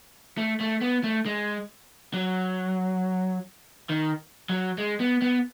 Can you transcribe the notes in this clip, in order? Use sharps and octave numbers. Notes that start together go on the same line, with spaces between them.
A3
A3
B3
A3
G#3
F#3
D#3
F#3
G#3
B3
B3